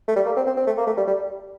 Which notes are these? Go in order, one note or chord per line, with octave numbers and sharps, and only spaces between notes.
A3
G3
A#3
C4
C4
C4
A3
A#3
A3
G3
G3